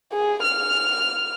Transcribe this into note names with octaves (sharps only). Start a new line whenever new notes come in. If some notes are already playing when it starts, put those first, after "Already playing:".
G#4
F6